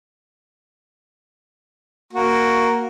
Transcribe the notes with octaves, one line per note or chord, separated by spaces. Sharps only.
A#3 F#4